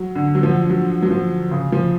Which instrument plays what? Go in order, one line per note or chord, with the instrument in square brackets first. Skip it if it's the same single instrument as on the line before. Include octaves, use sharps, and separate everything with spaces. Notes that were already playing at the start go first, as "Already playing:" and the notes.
Already playing: [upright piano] F#3
D3
F#3
F3
F#3
F#3
F3
C#3
F3